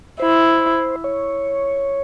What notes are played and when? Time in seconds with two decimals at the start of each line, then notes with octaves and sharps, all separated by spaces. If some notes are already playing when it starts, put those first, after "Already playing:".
0.20 E4 C5
1.04 C#5